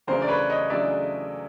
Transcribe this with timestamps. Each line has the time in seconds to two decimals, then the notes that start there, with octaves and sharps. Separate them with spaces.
0.07 E2 C#3 F#3 A3 D4 A#4 C5
0.22 D5
0.28 B4 C#5
0.49 C#5 D#5
0.70 E2 C#3 F#3 A3 D4 D5 E5